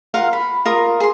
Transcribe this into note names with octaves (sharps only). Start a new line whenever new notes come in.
F4 A#4 F5 F#5
B5
F4 A#4 D#6
G#4 C6